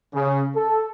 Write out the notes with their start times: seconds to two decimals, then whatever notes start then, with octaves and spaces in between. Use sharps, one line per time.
0.13 C#3
0.55 A4